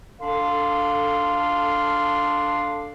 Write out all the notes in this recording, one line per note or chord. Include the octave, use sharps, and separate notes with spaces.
D4 A4 F5 C6